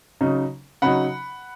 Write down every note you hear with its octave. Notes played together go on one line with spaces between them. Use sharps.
C#3 F#3 D#4
C#3 F#3 D#4 F#5 B5